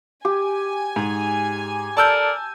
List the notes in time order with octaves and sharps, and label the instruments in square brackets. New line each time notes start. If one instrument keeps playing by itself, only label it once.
[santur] G4 [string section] G#5
[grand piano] G#2
[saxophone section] A4 A#4 D5 [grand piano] A5 E6 G6